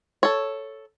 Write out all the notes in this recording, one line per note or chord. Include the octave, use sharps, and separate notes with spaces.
A4 C#5